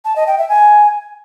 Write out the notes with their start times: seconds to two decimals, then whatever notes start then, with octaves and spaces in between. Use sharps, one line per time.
0.05 A5
0.16 D#5
0.27 G5
0.38 E5
0.49 G#5